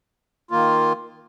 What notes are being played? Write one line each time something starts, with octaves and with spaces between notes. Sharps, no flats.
D#3 A#3 F4